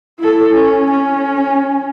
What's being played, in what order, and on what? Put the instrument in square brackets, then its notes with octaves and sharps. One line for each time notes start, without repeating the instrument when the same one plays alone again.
[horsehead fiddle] E4 A4
C#4
C#4